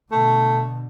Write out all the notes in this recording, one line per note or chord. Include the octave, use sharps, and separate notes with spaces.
B2 D3 A3